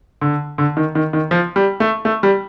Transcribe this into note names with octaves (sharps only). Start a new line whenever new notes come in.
D3
D3
D#3
D#3
D#3
F3
G3
A3
A3
G3